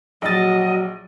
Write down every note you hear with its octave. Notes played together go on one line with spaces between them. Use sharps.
A#1 F#3 D#5 A6